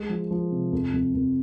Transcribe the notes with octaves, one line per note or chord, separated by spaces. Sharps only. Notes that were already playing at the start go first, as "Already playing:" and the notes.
Already playing: G#3 G#4
F3
F3
C3
F2
F2
F2